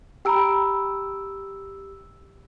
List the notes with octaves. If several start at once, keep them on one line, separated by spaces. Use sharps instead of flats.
G4 G5 A#5 B5 E6 D7